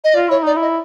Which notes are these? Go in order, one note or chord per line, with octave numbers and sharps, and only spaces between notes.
D#5
F4 D5
E4 C#5
D#4 D5
E4 D#5